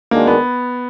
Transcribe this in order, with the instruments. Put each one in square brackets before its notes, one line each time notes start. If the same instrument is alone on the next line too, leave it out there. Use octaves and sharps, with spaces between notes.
[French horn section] D#3 G#3 D4 F#4 A#4 [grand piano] A#3
[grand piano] B3